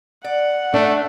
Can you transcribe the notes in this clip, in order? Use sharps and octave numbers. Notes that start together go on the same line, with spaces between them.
D5 F#5
A3 D4